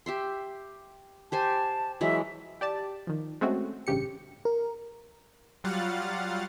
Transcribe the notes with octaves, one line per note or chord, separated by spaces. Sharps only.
G4 E5 C6
G4 C5 G#5 A5
E3 F#3 G#3 E5
G4 D5 A5
D#3 F3
G#3 A3 C4 C#4 F#4
A1 G2 C#3 G4 C#7
A#4
F#3 G3 F4 F5 F#5 A6